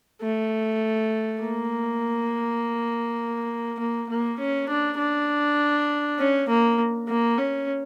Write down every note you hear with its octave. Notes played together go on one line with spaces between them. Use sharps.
A3
A#3
A#3
A#3
C#4
D4
D4
C#4
A#3
A#3
C#4